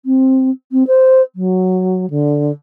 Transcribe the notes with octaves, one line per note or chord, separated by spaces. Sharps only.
C4
C4
C5
F#3
D3